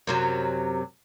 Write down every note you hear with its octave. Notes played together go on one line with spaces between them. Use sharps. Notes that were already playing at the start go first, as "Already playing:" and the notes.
F#2 C3 F#3